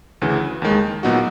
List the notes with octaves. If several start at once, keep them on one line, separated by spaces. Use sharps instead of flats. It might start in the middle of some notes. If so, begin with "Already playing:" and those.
D2 C#3 E3
D#2 D#3 G#3
A#2 F#3 B3 D#4 F#4